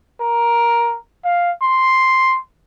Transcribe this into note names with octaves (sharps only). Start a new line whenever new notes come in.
A#4
F5
C6